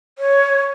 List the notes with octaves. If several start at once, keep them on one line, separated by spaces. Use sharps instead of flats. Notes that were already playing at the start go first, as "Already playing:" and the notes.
C#5